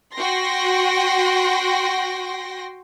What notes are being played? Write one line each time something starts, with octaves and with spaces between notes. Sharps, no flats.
F#4 G5 C6 A#6